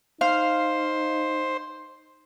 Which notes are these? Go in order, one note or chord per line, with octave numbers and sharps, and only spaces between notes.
D#4 C5 F5